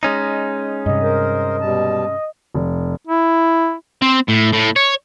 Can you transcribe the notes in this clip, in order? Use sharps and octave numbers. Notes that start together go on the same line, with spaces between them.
G#3 C#4 D#4
G2 C3 D#5
A#4 C5
B2 G3 A5
F1
E4
C4
A2
A2
C#5